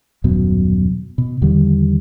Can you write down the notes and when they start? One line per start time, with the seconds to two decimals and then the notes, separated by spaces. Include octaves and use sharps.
0.24 D#1 F#2 B2 F#3
1.18 B2
1.42 E2 D3 D#3 G3